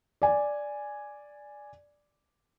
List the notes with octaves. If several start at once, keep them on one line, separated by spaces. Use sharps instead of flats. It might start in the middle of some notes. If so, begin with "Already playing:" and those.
D5 G#5